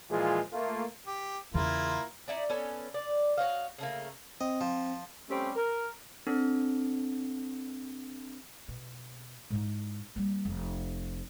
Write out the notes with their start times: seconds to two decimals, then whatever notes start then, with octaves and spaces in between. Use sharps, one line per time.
0.10 A#2 E3 F3 G#3 F4 G#4
0.53 A3 A#3 F4
1.07 G4
1.54 E2 C#3 A#3 E4 F4
2.28 D#4 E4 D5
2.49 B3 C#4 A4
2.94 D5
3.38 F#4 C#5 D#5 F5
3.78 C#3 A3 A#3
4.41 C4 D#5
4.61 F3
5.29 G3 A3 C4 C#4 G4
5.56 A#4
6.27 C4 D4 A4
8.68 B2
9.50 G#2 E4
10.16 G3 A#3
10.45 F1